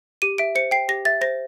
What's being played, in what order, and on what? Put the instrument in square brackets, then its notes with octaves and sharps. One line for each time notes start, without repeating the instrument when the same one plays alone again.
[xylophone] G4 D#7
E5 D7
C5 C#7
G5 C7
G4 A#6
E5 A6
C5 A#6